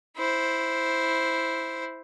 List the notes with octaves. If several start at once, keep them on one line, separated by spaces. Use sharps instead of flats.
E4 C5